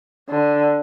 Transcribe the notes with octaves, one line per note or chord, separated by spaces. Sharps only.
D3